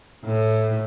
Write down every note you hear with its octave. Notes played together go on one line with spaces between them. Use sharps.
A2